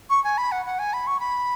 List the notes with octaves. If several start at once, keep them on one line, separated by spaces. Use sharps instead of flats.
C#6
G#5
B5
F#5
F#5
G#5
B5
C#6
B5